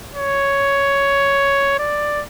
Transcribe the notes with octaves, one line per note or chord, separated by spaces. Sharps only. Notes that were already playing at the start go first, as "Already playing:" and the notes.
C#5
D5